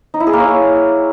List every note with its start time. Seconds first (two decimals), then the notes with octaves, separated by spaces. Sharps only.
0.14 D#4
0.20 E4
0.27 G#4
0.33 A#3
0.40 C#5